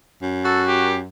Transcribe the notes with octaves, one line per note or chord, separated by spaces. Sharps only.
F#2
F#4 A4
G4